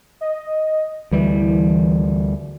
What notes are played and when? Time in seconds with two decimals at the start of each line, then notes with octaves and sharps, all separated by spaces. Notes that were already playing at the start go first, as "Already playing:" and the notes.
0.21 D#5
1.11 D2 E3 G3